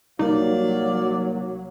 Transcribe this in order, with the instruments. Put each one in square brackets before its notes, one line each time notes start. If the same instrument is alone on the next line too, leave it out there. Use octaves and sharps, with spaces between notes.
[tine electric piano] C2 A#3 [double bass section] F#3 [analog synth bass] D#4 [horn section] D5 F5